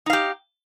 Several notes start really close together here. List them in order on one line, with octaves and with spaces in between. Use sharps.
D#4 F5 G4